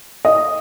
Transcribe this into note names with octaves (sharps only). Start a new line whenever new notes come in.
D#5